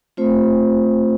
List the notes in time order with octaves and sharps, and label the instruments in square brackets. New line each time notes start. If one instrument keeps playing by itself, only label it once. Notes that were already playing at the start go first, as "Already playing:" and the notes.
[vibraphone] A3 C4 F4 C5